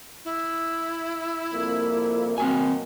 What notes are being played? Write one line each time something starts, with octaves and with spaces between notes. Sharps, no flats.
E4
C2 F2 A#3
B2 F#3 A#3 C4 F#4 G#5